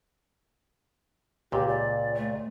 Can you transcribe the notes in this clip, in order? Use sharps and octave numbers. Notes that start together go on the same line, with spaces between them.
C#2 A#2 G4
D5
A3